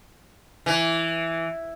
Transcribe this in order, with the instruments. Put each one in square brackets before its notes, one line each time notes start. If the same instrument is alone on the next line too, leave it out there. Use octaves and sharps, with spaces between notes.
[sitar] E3